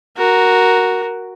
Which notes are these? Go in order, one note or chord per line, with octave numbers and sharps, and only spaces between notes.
F#4 A#4